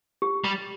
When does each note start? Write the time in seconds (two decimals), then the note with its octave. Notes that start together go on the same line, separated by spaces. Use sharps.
0.22 G4
0.44 G3